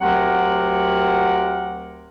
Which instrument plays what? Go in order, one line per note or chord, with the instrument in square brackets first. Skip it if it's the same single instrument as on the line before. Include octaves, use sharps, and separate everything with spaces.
[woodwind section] D2 F#3 C4 G4 A#4 F#5